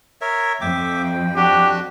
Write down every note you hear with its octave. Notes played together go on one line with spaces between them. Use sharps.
A#4 C#5 E5
F2 E5 G5 D6
G5
D4 F#4 G4